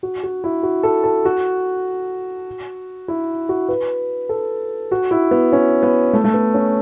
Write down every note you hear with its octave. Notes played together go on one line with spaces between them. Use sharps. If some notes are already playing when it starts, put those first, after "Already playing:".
F#4
F#4
E4
F#4
A4
A4
F#4
E4
F#4
B4
A4
F#4
E4
B3
C#4
B3
A3
A3
B3
C#4